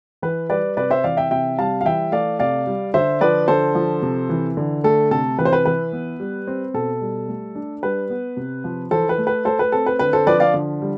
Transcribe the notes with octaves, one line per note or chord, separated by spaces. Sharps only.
E3 B4
G3 B4 D5
C3 B4 D5
C5 E5
E3 D5 F5
E5 G5
C3 E5 G5
G3 F5 A5
F5
E3 E5 G5
A3 D5 F5
C3 D5 F5
G3
D3 C5 E5
F3 B4 D5
D3 A4 C5
F3
C3
E3
D3
A3 A4
C3 A4
E3 B4
C5
B4
E3 B4
B3
G3
C4
B2 A4
G3
A3
D4
G3 B4
B3
C3
F3
E3 A4 C5
B4
A3
B4
A3 A4 C5
B4
C4 A4
B4
D3 B4
A4 C5
F3 B4 D5
D5 F5
D3
G3